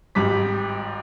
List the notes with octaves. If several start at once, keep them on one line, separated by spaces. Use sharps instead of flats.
G#1 G#2 G3 D6 B6